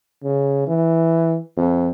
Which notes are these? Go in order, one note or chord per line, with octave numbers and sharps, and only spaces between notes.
C#3
E3
F2